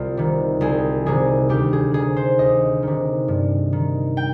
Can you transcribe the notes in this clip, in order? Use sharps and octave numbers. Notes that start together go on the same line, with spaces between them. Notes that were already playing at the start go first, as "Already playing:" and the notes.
Already playing: C2 F4
C3 D#3
C2 G#4
C3 D#3 G#4
D2 G4
G#4
C3 D#3 G#4
C5
D2 D#5
C3 D#3
G2
D#3
G5